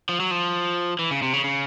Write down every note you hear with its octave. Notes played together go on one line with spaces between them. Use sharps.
F3
F#3
F3
E3
C#3
C3
C#3
C#3